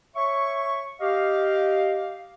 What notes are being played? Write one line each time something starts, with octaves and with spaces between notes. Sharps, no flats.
C#5 E5 C#6
G4 D#5 F5